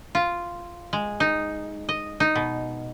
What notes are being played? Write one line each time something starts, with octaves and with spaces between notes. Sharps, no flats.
F4
G#3
D#4
D#5
D#4
B2